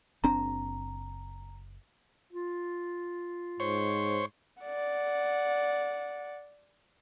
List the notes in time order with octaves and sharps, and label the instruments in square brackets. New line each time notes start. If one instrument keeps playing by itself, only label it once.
[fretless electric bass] F#1 C4 D4 [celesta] A#5
[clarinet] F4
[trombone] G#2 [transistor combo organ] C5 C#5
[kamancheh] D5 F#5